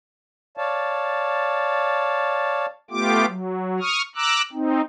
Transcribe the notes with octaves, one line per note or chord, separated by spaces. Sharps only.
C#5 D5 F5 A5
A3 B3 F4 G4 D6
F#3
C#6 D#6 F6
A#5 D6 E6 F#6
C4 D#4